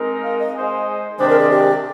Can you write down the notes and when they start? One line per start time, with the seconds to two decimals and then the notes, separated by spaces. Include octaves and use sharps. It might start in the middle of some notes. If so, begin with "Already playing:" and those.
Already playing: G#3 C4 D#4 A#4
0.23 F5
0.39 D#5
0.55 G#3 D#4 G#4 C5
1.19 C3 D#3 G#3 D4 C5
1.29 A#4
1.39 G#4
1.50 G4